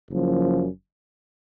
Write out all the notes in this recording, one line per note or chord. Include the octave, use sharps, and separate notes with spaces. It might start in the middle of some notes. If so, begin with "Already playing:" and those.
F#1 F#2 F3